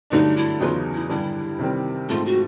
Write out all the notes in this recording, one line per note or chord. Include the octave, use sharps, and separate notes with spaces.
G2 D3 F#3 A3 D4 D#4
E4
E2 C#3 F#3 B3 D#4 F4
E4
G2 D3 G3 E4
C3 D#3 G3 C4
G#2 F3 A3 C4 F4
F#4